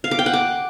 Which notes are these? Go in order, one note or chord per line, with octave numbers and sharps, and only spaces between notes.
F5
D6
G5
F#5
D6